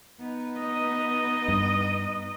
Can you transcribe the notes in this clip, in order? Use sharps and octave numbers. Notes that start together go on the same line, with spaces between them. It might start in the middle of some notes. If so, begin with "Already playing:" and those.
B3 D#4 B4
D#5
G2